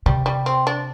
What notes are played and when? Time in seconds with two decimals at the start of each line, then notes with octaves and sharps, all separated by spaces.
0.06 C3 G3
0.26 G3
0.46 C4
0.67 D4